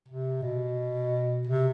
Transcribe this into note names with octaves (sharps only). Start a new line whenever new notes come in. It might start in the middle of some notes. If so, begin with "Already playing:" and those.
C3
B2
C3